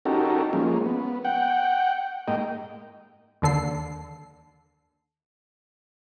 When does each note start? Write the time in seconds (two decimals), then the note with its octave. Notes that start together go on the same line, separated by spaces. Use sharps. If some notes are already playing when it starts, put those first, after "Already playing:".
0.05 C#4 D#4 F#4 G4 A4 A#4
0.53 F3 G#3 A#3 C#4
0.86 B3
1.25 F#5 G5
2.28 G#2 A#3 D#5 G5
3.42 D#2 D3 A4 C7